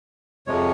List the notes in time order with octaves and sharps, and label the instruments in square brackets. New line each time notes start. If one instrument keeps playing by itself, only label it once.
[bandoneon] F2 C3 F3 G#3 C#5